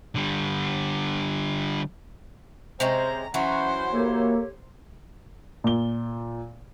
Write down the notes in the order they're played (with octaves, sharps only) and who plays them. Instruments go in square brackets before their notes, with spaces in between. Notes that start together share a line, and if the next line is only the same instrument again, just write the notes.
[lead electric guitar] D3 G3
[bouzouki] C3 G#3 C#4 [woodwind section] C5 [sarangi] A#5
[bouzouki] E3 F#3 F#4 [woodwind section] C#4 F#5 [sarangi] C5
[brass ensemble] A#3 [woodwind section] G4 A4 C#5
[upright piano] A#2 G7